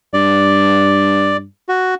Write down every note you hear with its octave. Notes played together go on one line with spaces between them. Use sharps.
G2 D5
F#4